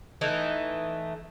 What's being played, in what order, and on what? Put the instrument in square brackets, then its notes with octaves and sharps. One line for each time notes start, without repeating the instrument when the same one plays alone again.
[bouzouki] E3 A3 D#4